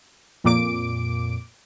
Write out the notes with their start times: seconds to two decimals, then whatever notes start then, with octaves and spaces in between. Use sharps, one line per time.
0.44 F2 A#2 D6 D7